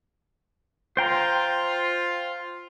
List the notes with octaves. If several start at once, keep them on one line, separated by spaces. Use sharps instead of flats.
F4 C5 G5 A#5